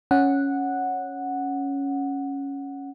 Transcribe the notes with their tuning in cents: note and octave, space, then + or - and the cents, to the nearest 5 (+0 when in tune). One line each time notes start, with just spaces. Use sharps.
C#4 +0 F#5 -5